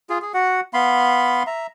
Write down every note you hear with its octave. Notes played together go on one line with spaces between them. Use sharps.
F4 G#4
G#4
F#4 F#5
B3 F5 B5 C6
E5 A#5